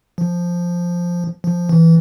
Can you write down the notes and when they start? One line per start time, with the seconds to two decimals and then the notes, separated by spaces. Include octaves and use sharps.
0.18 F3
1.44 F3
1.69 E3